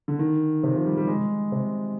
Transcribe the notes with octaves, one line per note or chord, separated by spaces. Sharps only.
D3
D#3
C3
F3
G3
G3
G#3
C3